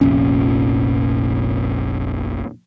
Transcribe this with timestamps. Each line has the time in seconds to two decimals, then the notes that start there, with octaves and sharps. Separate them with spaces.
0.01 F1 A#1 A#2 C#4